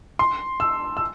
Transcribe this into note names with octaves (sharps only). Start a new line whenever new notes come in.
C6
E6
E6